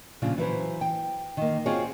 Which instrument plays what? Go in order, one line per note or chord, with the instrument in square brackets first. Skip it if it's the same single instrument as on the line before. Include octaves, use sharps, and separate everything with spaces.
[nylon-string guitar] A#2 C#3 F3 D4 F4 G#4
E3 F#3 B4 C5
G5
D#3 A#3
C4 F4 F#4 G#4 C#5